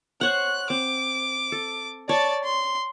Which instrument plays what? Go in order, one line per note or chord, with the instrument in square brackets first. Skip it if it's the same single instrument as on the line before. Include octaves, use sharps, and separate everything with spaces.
[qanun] C5 C#5 F#5 [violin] F#6
[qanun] C4 [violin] D6
[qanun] A4
[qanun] C#5 [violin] D5 A5
[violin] C6